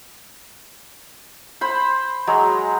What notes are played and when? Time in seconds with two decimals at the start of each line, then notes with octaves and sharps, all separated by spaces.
1.61 C5 B5
2.27 F#3 G#3